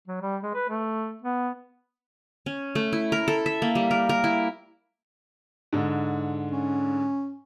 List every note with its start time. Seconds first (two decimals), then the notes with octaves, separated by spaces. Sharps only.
0.08 F#3
0.22 G3
0.43 G#3
0.54 B4
0.70 A3
1.22 B3
2.46 C#4
2.75 A3
2.93 E4
3.12 A#4
3.28 A4
3.46 E5
3.62 A#3
3.75 G3
3.91 A#4
4.09 A#4
4.24 E4
5.73 G#2 D3
6.51 C#4